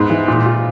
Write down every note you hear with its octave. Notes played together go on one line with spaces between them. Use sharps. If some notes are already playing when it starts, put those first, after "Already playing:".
Already playing: G#2 B3
E3
A#2
F4